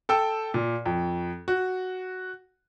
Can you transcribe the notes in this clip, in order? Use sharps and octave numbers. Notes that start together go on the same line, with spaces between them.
A4 G5 E6
A#2
F2
F#4